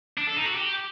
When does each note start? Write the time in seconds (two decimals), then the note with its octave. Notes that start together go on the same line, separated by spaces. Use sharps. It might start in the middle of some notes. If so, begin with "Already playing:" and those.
0.17 D4
0.27 A4
0.36 D#4
0.46 F#4
0.55 G4